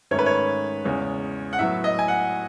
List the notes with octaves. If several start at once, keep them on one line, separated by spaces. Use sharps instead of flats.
G#2 D#3 A3 C#4 C#5
B4
C#5
E2 C#3 G#3 C#4
F#5
A2 F#3 B3 E5
D#5
G#5
F#5